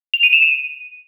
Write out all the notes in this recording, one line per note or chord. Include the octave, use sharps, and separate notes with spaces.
F7
D#7
E7
D#7